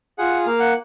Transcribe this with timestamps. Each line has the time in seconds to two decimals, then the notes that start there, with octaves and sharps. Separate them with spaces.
0.18 F4 G#4 F#5
0.46 A#3 F5
0.60 F#5